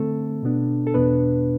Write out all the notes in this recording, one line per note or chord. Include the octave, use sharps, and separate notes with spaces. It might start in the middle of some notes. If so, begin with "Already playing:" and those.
Already playing: D3 A3 C4 A4
B2 B3 D4
A4
E2 B2 B3 D4 B4